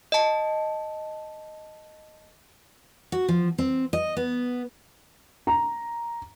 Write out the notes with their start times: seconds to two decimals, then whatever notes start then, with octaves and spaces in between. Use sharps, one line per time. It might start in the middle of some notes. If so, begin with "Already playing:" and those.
0.12 D#5 A5
3.12 F#4
3.29 F3
3.58 C4
3.93 D#5
4.17 B3
5.47 A#5